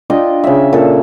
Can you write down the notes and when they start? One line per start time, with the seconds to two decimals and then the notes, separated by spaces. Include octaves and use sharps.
0.10 D4 F4 D#5 G5
0.44 C#3 E5
0.73 A#2 A4